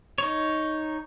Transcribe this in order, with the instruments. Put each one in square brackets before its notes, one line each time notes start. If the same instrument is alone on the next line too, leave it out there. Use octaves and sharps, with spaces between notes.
[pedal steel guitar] D#4 C#5